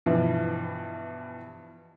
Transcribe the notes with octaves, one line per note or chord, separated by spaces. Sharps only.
G2 B2 E3 F3